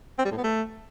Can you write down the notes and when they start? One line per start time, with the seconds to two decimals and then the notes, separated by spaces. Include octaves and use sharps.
0.18 C4
0.25 G3
0.31 A2
0.37 B3
0.44 A3